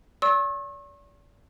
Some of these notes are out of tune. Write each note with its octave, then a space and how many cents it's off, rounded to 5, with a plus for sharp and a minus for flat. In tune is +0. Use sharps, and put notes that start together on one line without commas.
D5 -40 C#6 -40 E6 -25